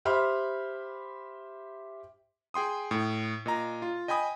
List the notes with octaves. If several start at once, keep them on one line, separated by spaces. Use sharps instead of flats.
G4 C5 E5 B5 C6 F6
G#4 G5 C6 D#6
A2
A#2 D#5 A#5
F4
D#5 G5 G#5 B5 D#6